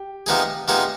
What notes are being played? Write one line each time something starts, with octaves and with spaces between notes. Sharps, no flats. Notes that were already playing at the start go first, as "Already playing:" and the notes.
Already playing: G4
C3 F3 B3 D#4 G#4
C3 F3 B3 D#4 G#4